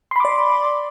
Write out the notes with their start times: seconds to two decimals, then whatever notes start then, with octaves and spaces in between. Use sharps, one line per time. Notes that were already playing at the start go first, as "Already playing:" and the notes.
0.11 C6
0.16 B5
0.20 D6
0.25 D5